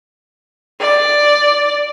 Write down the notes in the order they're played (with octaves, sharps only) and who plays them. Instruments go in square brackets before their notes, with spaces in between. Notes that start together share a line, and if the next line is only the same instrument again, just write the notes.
[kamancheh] D5